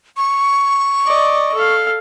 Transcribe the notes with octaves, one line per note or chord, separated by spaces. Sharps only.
C#6
D5 D#5
A4 F5